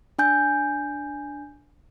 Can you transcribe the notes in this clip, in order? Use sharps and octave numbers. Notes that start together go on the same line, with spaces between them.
D4 G#5 G6